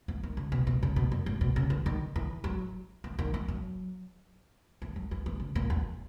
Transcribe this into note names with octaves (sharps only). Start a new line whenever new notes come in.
E3
D#3
C#3
B2
B2
C#3
B2
F#2
G#2
B2
C#3
E3
D#3
E3
F#3
E3
D#3
E3
F#3
E3
F#3
E3
E3
C#3
A#2
E2